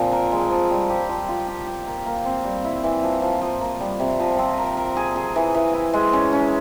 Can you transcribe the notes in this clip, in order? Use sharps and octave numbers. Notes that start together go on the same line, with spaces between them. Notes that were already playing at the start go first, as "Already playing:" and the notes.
Already playing: A#2 F3 C4
A#4
G#3
F3
G3
G4
F3
F4
G4
G4
A#3
A#3
C4
G3
E4
E3
F3
F3
F3
A#3
G3
C3
F3
C4
A#4
A#4
G#4
G#4
E3
E3
E4
G#3
C#4
C#4